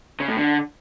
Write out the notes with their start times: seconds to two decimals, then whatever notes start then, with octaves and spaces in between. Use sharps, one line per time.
0.20 C#3
0.28 A2
0.37 D3